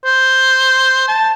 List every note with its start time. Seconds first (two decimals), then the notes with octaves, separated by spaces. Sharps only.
0.05 C5
1.08 A5